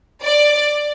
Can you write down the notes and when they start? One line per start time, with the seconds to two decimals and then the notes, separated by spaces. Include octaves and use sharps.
0.22 D5